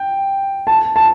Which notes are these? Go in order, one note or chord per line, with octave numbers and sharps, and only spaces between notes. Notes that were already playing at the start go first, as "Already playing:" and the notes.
Already playing: G5
A5
A5